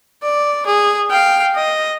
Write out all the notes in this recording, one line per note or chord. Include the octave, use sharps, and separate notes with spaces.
D5
G#4
F5 G5
D#5